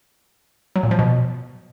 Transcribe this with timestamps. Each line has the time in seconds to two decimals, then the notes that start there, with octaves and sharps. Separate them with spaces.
0.76 F#3
0.83 A#2
0.91 F3
0.99 B2